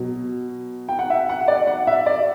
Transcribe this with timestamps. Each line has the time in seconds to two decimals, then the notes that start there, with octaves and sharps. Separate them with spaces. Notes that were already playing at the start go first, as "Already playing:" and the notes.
Already playing: B2 F#3
0.89 G5
0.99 F#5
1.10 E5
1.29 F#5
1.48 D5
1.67 F#5
1.87 E5
2.06 D5